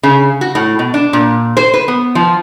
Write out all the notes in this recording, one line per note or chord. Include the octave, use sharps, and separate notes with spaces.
C#3
F#4
A2
B2
D4
A#2
C5
B4
B3
F3